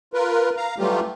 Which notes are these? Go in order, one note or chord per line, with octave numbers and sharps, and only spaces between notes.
F4 A#4 B4
F5 A#5
E3 F#3 G3 A3 F4 G4